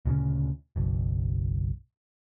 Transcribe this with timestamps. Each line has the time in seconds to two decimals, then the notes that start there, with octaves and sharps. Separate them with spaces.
0.05 D2 A#2 C#3 C#4
0.76 F#1 B1